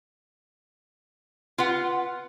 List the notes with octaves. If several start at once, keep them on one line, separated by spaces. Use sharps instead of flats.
F4 B4 F#5